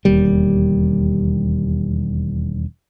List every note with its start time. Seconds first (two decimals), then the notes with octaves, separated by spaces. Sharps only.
0.05 E1 D#2 G3